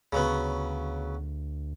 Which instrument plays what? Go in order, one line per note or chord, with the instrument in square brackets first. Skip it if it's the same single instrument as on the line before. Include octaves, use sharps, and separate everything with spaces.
[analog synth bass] D2 [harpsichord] C#3 F#3 B3